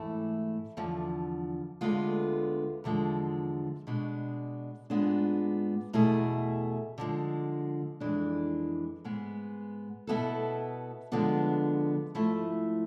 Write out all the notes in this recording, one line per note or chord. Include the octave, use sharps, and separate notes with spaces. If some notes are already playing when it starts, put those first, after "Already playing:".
Already playing: G#2 E3 A3 E4
E2 D3 F3
D2 D3 G#3 B3 F4
E2 D3 F3 G#3
B2 G#3 D4
G#2 G#3 B3 D4 F4
E2 B2 A3 E4 G#4
D3 F3 G#3
F2 E3 G#3 D4
G#2 G#3 B3
B2 B3 E4 A4
D3 F3 G#3 B3 D4
G#2 F3 A3 E4